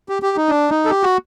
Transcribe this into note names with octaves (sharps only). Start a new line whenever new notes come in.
G4
G4
D#4
D4
D#4
A4
G4
F#4